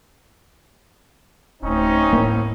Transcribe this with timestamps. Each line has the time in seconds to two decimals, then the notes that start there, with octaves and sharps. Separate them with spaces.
1.63 D1 D2 C4 C#4 D#4
2.13 A2 A#3